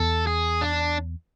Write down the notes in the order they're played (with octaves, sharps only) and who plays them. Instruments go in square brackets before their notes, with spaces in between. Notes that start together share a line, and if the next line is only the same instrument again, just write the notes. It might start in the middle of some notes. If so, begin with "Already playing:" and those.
Already playing: [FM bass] E2 [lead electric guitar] A4
[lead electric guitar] G#4
D4